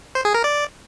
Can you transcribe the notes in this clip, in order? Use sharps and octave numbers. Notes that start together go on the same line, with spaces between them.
C5
G#4
A#4
D5